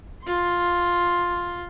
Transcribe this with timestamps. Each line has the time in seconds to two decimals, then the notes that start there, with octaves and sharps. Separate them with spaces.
0.24 F4 C6